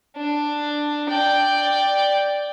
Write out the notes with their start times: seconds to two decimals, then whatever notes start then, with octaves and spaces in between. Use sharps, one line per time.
0.17 D4
1.09 D5 G5